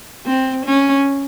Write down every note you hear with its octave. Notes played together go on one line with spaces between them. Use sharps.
C4
C#4